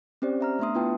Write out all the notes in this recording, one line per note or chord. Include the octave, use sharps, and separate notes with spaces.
C4 C#4 G4 C5 D5
E5 A#5 F6
A3 B3 D4 E5 C6 D#6
B3 E4 F4 B4 G5 A5